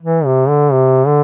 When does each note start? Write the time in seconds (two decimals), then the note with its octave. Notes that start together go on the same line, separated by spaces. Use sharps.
0.02 E3
0.25 C3
0.49 D3
0.72 C3
1.07 D3